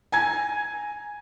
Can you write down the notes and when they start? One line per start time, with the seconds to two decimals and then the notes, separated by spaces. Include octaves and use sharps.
0.12 G#5 A#5 G#6